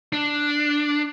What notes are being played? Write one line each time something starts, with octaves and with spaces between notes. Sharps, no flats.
D4